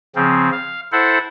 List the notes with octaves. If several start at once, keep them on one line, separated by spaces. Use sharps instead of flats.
C#3 F3 C4
F5
E4 A4 C5 F#5